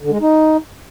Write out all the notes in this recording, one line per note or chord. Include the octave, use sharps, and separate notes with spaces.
D3
G#3
D#4